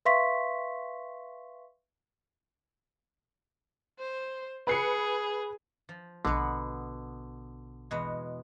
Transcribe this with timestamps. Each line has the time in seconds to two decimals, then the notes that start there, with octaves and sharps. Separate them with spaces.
0.05 B4 E5 F5 C6 C#6 B6
3.99 C5
4.67 G#4 B4 C7 C#7
5.89 F3
6.25 A#1 B2 D3 B3
7.91 E2 B2 G#3